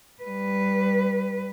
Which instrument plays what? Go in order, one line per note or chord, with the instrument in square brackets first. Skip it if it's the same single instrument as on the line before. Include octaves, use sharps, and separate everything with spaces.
[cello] G3 B4